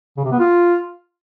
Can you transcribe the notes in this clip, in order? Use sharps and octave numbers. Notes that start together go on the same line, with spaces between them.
C#3
C3
B3
F4